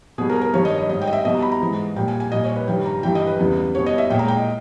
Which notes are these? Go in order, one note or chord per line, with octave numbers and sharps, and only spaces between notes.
B2 G3 G#4
A#4
A#4
G2 D#3 G3 C#5
D#5
D#5
G#2 G3 D#5
G5
D#5
E5
B2 G3 D#5
A#5
B5
A#5
G#2 E3 G#3
A#2 G3 G5
G#5
G#5
A#2 G3 D#5
C#5
B4
G2 D#3 G3 G5
A#5
G2 E3 G3 G5
D#5
B4
E2 C#3 G3
B2 G3 C#5
D#5
E5
A#2 G#3 G5
A#5
G5
D#5